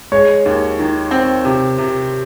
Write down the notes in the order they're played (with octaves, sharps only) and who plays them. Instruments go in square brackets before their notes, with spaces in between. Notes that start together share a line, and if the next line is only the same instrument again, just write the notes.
[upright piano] G#3 [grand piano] C#5
[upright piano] D#2
D#3
C4
C3
C3